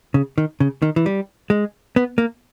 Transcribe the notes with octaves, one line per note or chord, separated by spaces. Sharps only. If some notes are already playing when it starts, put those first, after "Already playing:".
C#3
D#3
C#3
D#3
E3
G3
G#3
B3
A#3